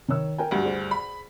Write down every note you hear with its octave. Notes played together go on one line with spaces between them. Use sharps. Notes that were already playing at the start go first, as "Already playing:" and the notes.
D#3 C#5 E6
A#4 G5 G#5
D2 G2 F#4 G4
G#4 C5 D5
B5